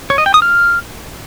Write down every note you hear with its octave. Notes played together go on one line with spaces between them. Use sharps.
C#5
D#5
G5
D#6
F6